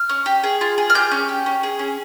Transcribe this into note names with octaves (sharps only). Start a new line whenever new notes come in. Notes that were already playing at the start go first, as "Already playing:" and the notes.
Already playing: F6
C#4
G4
G#4
F4
G#4
F6
G4 G6
C#4
G4
C#4
G#4
C#4